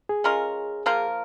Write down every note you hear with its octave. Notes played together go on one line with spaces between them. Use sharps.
G#4
G#3 C#4 F4 A#4
F3 A#3 F4 A#4